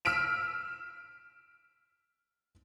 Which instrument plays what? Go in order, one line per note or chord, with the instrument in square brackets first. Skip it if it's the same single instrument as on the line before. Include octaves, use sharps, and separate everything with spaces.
[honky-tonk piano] E6 F6 B6 D7 E7